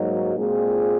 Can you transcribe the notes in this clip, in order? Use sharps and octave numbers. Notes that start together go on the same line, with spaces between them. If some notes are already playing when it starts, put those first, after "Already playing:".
Already playing: G#2 F#3 A#3 D#4 F#4
A#2 G#3 C4 F4 G#4